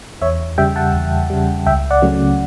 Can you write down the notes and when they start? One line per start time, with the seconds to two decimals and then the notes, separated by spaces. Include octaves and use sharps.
0.21 E2 C#5 E5
0.58 C#3 G3 E5 G5
0.76 F#5 A5
0.94 E2
1.30 C#3 G3
1.66 C#2 E5 G5
1.91 D5 F#5
2.02 C#3 F#3 A3 C#4